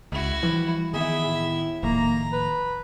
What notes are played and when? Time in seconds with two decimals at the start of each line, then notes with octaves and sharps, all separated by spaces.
0.12 C#2 E4 F#4
0.43 E3 F3 G3
0.94 D#3 B3 E4 G#4 E5
1.25 A2
1.83 D#1 A2 D#3 F3 A#3 A#5
2.33 B4